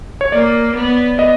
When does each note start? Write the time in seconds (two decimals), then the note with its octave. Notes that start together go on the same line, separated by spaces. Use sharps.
0.21 C#5
0.32 A#3 D5
0.75 B3
1.19 D#5